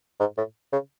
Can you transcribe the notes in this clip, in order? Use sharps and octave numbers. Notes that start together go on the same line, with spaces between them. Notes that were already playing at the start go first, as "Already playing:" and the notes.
G#2
A2
C#3